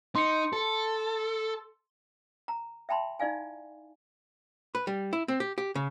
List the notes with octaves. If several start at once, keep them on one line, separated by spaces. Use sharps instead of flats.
D#4 C6 C#7
A4
A#5
E5 G5 A5 B5 C6
D#4 E4 D5 F5 G#5
B4
G3
E4
C4
G4
G4
C#3